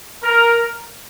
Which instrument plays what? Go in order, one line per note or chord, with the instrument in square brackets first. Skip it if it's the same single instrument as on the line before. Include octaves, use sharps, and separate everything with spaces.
[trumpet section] A#4